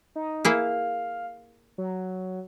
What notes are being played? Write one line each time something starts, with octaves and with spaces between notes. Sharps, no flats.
D#4
A#3 E4 G#4 F5
F#3